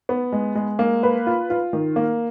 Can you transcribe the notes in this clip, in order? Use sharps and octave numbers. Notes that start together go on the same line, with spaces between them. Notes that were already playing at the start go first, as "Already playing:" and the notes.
B3
G#3
G#3
A#3
B4
F4
F4
D#3
A#3